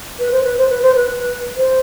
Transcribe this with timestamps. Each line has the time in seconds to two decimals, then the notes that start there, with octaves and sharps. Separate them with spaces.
0.19 B4
0.31 C5
0.44 B4
0.57 C5
0.69 B4
0.82 C5
0.95 B4
1.57 C5